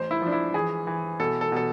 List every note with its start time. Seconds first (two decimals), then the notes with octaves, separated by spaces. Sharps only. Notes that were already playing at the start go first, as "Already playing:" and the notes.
Already playing: A1 C5
0.11 E4
0.22 F3 D4
0.32 E4
0.54 E3 G#4
0.87 E3
1.20 B2 A4
1.41 A4
1.52 B2 A4